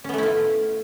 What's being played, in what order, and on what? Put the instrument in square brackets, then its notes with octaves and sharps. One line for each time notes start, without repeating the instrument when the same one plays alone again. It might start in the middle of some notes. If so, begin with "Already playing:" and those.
[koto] C#4
B3
A3
E4
F4